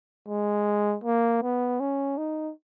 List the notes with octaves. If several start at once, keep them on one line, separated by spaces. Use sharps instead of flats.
G#3
A#3
B3
C#4
D#4